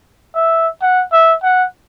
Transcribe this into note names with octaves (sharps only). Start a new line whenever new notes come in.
E5
F#5
E5
F#5